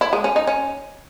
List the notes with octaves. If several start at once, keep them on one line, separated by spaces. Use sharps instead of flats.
E4
G#3
C#4
D#4
C#4